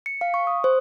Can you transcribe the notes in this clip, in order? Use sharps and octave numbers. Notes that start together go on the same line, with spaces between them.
C#7
F5
C#6
D#6
C5